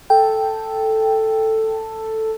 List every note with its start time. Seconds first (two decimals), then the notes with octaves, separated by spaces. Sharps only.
0.10 A4 G5